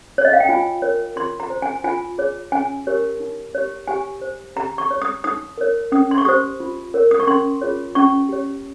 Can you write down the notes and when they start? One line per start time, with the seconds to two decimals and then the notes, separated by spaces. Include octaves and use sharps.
0.18 C#5
0.25 D#5
0.33 F5
0.40 G5
0.49 F4 G#5
0.82 A#4 C#5
1.16 F4 C6
1.40 A#5
1.50 C5
1.62 G#5
1.84 F4 G#5
2.18 G#4 C#5
2.52 C#4 G#5
2.87 G4 A#4 C#5
3.20 D#4
3.55 G4 C#5
3.88 G4 G#5
4.21 C5
4.56 G4 A#5
4.78 C#6
4.91 C#5
5.02 D#6
5.24 D#4 D#6
5.58 A#4 C#5
5.92 C#4 D#6
6.11 C6
6.18 C#6
6.25 G4 C5 D#6
6.60 F4
6.94 A#4 C#5
7.11 D#6
7.20 C#6
7.27 C#4 C6
7.61 F4 G#4 C#5
7.95 C#4 C#6
8.29 G4 C#5